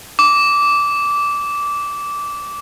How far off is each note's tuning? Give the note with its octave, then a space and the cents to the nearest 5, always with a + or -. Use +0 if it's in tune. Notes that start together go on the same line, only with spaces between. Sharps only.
D6 -15